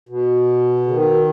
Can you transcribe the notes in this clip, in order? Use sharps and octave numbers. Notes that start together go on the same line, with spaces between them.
B2
C#3
D#3